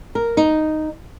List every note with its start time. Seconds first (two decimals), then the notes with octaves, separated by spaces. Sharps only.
0.15 A#4
0.37 D#4